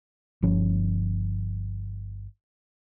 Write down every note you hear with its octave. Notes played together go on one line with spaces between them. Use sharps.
G1 F3 C#4